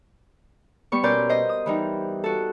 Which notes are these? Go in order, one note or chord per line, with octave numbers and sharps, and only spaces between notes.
G3 B3 C#6
B2 C#4 A#4 D5 C6 G6
C5 D#5
D#6
E3 G3 D#4
F#4 A4